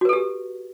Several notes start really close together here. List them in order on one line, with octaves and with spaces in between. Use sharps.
F#4 B4 A4 G4